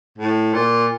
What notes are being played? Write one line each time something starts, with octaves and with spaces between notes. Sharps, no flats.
A2
A#2